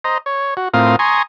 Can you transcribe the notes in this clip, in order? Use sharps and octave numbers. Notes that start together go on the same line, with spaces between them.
C5 D#5 A#5
C#5
F#4
A2 C4 F4 A#4 F5 D#6
G#5 A#5 C6 C#6 D#6